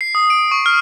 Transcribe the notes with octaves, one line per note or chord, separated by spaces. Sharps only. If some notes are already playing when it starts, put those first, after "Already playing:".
C7
D#6
D7
C#6
F6